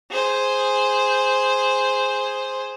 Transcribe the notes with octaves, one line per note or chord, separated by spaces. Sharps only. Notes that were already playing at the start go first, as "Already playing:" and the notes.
G#4 C5